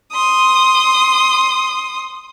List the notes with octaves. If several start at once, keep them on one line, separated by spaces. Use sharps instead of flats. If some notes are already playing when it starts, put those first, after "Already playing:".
C6 D#6